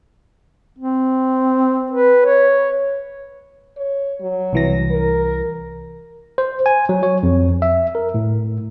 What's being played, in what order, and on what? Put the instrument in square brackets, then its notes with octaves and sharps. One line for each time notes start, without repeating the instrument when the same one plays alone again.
[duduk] C4
B4
C#5
[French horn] C#5
F#3
[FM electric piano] C2 E3 A#6
[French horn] A#4
[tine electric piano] C5
G#5
F#3
C#5
F2
E5
A#4
A2